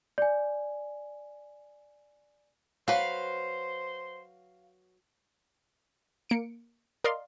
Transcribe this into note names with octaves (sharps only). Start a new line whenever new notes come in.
D5 G#5
F#3 B4 C5 F5
A#3 C#7 D7
A#4 D5 D#5 F5 C6